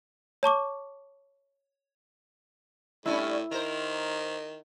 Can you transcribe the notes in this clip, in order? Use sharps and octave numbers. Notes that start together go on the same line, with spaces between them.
C#5 A5 C#6 D6
A2 G3 C#4 D4 E4
D#3 A#4 C5